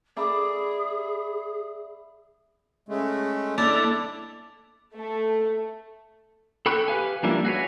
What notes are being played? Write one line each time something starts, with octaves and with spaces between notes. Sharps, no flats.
G#4 D5 E5 B5
C#3 G#3 A3
A#3 D4 E4 A4 D5
A3
A4 G5 B5 C#6 F#6
G4 B4 F5 G#5
F3 G3 A#3 D4 E4
F#4 G#4 B4 C#5